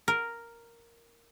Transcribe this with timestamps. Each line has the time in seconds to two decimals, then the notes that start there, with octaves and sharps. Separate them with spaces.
0.08 A#4